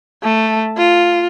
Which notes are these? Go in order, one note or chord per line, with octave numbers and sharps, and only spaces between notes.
A3
F4